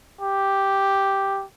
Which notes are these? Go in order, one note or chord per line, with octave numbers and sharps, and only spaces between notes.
G4